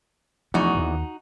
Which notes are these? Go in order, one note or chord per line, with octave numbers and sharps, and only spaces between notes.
E2 F3 A3 C#4 D#4 F#4
D1 D#2